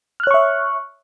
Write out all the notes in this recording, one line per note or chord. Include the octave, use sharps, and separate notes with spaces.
C#5 E5 C#6 F6 F#6